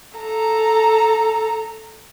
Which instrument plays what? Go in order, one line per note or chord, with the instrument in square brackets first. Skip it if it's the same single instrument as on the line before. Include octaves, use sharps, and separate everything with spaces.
[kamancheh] A4 A#5